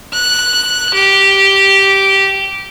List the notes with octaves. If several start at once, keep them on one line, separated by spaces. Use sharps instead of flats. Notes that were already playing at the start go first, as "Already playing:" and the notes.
F#6
G4